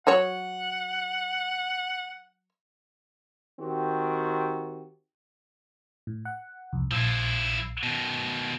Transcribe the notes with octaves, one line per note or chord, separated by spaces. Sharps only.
F#3 F#4 C#5 F#5
D#3 C4 F#4 G4
A2
F#5
C2 F2
A#1 F3 E4 E6 C7
B2 D#3 A#6